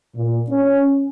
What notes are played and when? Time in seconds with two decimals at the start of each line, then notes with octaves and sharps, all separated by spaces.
0.16 A#2
0.50 C#4